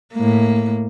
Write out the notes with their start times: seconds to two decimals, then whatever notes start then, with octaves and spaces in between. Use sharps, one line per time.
0.14 A2 A#3